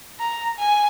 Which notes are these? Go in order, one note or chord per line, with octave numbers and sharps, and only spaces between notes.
A#5
G#5